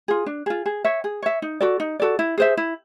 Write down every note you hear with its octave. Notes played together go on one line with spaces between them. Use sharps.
F4 G#4
D4
F4 G#4
G#4
C#5 E5
G#4
C#5 E5
D#4
F#4 A4 D5
D#4
F#4 A4 D5
E4
G#4 C5 E5
E4